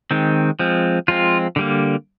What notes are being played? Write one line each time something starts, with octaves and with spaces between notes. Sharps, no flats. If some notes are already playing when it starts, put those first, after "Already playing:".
D#3 G#3 C4
F3 G#3 C4
F3 G#3 C4 F4
D3 G3 A#3